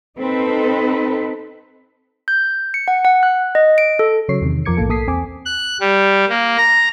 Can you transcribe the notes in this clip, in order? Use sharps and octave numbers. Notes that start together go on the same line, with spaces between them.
C4 D#4 A4 B4
G6
C#7
F#5
F#5
F#6
D#5
D7
A4
C#3 F#3 C#5 C7
E2 C3 D#3
F2 F3 A#4 D6 G#6 C#7
B1 A2 A#3 A4
B1 A#3 A4 D#6 B6 C7
E2 C4 G#5 D6
F#6
G3
A#3
A#5